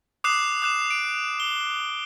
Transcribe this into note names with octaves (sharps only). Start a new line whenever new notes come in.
D6 D#6 F#6 C7 E7
D6 F#6 E7
D7
G7